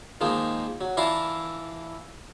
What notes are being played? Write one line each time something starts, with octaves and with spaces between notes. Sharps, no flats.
D#3 F3 G#3 A#3
F#3
E3 D4 E4 F4 F5 A#5